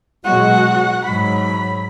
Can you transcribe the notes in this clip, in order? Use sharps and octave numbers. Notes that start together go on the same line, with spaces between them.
B2 F#3 G#3 F#4 F#5
G#2 F#3 B5